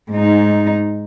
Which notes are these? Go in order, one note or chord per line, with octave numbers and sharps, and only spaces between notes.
G#2 D#4